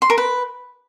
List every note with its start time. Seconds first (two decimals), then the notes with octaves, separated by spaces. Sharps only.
0.02 C6
0.10 A#4
0.18 B4